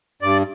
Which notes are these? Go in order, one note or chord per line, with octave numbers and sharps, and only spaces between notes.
G2 D5